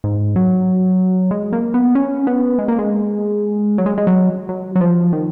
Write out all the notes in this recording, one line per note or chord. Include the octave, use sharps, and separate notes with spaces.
G#2
F#3
G#3
A#3
B3
C#4
B3
G#3
A#3
G#3
F#3
G#3
G#3
F#3
F#3
F#3
F3
D#3